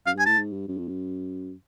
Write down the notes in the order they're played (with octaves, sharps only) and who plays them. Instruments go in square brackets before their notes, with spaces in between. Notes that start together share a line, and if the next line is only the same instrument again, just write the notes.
[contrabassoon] F#2 [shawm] F5
[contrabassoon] G2 [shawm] G#5
[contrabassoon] A2 [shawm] A5
[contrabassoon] G#2
G2
F#2
F2
F#2